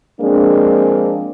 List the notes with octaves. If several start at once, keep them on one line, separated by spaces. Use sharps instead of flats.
F3 G#3 A#3 C4 D4